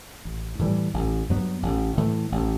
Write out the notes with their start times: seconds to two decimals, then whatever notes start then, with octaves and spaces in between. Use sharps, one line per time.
0.25 A1
0.59 A2 E3 G3
0.94 A1
1.29 G2 F#3 B3
1.63 A1
1.98 A2 E3 A3
2.32 A1